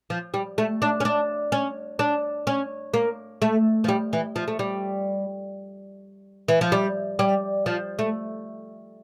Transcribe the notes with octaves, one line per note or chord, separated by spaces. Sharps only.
F3
G3
A3
D4
C#4
D4
C#4
D4
C#4
A#3
A3
F3
G3
E3
F3
A3
G3
E3
F3
G3
G3
F3
A3